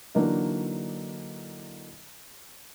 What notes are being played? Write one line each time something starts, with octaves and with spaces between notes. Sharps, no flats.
D3 E3 F#3 A#3 D4 D#4